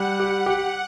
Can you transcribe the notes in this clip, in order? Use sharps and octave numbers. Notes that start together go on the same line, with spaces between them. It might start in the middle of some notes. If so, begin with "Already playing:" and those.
Already playing: G3 F#5
G4
G4